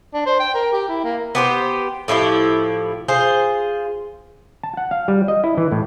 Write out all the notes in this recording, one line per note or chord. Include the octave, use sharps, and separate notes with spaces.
D4
C5
G5
A#4
G4
E4
A#3
B3 G4 C5
A2 F3 E4 G4
F4 G#4 C5
A5
F#5
F5
G3
D#5
E4
E3
A2